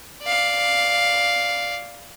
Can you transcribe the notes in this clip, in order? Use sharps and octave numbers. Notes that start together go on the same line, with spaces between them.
D5 F5